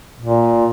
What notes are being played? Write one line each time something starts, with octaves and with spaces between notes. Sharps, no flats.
A#2